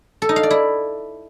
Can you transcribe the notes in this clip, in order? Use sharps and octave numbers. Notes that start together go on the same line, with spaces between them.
A4
D#4
F5
D5
E4